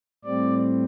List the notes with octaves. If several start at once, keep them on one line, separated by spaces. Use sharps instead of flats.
A2 G3 C4 D5